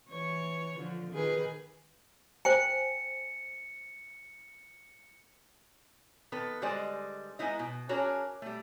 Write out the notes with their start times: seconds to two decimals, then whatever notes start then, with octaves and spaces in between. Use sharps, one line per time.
0.10 E3 C#5
0.78 D3 F3
1.12 D#3 G#4 B4
2.45 C5 G5 G#5 C#7
6.32 D#3 B3 A4 B4
6.62 D3 G3 G#3 C5 D5 D#5
7.39 G#3 B3 D#4 E4 D#5
7.59 B2
7.89 C#4 D4 F#4 G#4 A#4 C#5
8.42 G3 A3